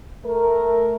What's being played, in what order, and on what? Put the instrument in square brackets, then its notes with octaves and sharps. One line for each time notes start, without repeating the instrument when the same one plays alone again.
[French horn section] A3 A#4